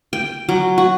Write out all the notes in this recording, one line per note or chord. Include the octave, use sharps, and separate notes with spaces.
G5
F#3
F#4